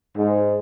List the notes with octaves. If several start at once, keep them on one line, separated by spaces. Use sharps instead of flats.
G#2